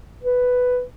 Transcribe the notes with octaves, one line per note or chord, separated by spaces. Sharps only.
B4